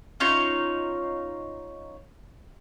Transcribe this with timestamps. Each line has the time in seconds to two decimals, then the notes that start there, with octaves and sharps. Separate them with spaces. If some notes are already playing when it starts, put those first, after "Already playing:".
0.20 C#4 D#4 F4 C#5